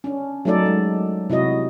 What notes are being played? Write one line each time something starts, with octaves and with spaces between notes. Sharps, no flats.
C#4 D4
F#3 A3 D#4 A4 D5
G#3
C3 E4 F#4 D#5